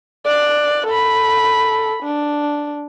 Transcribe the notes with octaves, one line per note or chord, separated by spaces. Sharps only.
D5 F#6
A4 B5
D4